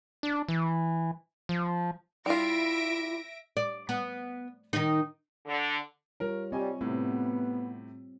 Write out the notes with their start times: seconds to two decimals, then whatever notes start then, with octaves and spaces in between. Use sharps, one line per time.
0.23 D4
0.48 E3
1.49 F3
2.26 G3 E4 F4 E5 A#6 D7
3.57 D5
3.89 B3
4.73 D#3 D#4
5.46 D3
6.20 G3 F4 A#4 C#5
6.52 G3 C4 C#5 D#5 G#5
6.81 A2 C3 B3 C4